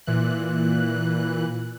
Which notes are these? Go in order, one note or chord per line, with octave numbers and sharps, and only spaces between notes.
A#2 E3 F#6